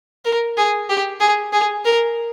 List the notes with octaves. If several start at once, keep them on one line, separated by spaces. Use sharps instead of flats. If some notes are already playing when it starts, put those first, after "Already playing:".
A#4
G#4
G4
G#4
G#4
A#4